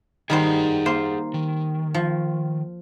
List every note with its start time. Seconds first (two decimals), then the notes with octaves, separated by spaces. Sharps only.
0.30 D#3 G3 G#4 C5 F#5 A#5
0.86 A#3 C5
1.34 D#3
1.94 F3